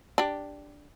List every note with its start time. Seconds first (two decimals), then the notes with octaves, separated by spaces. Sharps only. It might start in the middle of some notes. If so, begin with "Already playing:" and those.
0.18 D4 G4